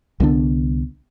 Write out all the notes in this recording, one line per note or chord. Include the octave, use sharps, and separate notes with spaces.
C2 D3 B3 D4